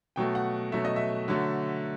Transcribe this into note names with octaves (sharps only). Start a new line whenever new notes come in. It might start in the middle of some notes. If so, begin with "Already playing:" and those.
B2 F#3 A3 G5
F#5
B2 F#3 A3 E5
D#5
E5
D3 F#3 A3